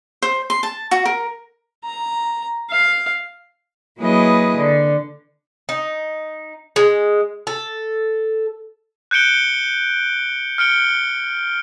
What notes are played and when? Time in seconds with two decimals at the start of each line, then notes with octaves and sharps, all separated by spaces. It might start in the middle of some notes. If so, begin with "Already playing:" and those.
0.22 C5
0.50 C6
0.63 A5
0.91 F#4
1.06 A#4
1.85 A#5
2.71 F5
3.99 F#3 A#3 E4 G#4 B4 D#5
4.57 D3
5.69 D#4
6.76 G#3
7.47 A4
9.11 F#6 G6 C#7 D7 G7
10.58 F6 C#7 D7 G7